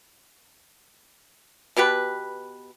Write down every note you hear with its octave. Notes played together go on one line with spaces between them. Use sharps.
B2 B3 G4 B4